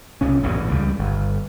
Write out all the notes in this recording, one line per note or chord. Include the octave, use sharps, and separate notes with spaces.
C2 C#3 C#4
A1 E2 G#2 B2
C#2 C#3 G3
G1